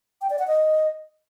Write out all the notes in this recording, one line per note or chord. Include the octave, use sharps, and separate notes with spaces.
G5
D5
F#5
D#5